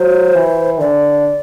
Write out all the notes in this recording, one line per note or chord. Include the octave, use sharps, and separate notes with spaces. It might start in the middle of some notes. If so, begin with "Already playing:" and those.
Already playing: F#3 C5
E3
D3 D5